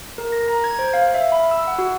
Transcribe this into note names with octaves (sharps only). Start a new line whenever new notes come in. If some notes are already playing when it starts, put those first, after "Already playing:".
A#4
A#6
A#5
G#6
C5
F5
E5
B5
E6
F#5
F#4